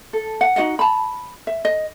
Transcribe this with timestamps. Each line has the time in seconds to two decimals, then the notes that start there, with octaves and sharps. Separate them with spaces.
0.13 A4
0.41 F#5
0.56 D#4 F#4 D#5 F#5
0.79 A5 B5
1.47 E5
1.65 D#5